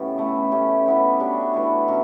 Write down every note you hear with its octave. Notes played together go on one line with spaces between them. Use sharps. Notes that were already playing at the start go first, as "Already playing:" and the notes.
Already playing: A2 C#3 B3 C#4 G4
E3 A3 E4
A3 C#4 G4
E3 B3 E4
G3 D4 F#4 C#5
E3 A3 E4
B2 F#3 C#4 F#4